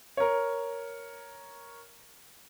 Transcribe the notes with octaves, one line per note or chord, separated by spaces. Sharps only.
A#4 C#5